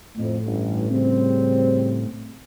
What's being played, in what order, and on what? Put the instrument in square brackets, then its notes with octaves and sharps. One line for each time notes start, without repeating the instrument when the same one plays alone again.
[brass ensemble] F2 [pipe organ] A2
[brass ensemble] A1 G2
C#3 G3 C4